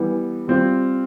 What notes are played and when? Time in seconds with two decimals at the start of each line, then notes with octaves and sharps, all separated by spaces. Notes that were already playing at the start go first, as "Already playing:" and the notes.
Already playing: E3 G3 B3
0.48 G3 C4 F4